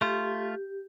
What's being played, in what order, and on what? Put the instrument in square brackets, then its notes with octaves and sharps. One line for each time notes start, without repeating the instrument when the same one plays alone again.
[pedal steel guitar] A3 F4 [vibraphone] G4